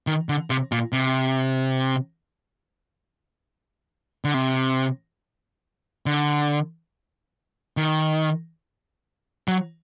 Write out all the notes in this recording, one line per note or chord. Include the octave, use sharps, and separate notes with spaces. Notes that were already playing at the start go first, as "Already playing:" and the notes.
D#3
D3
C3
A#2
C3
D3
C3
D3
D#3
F#3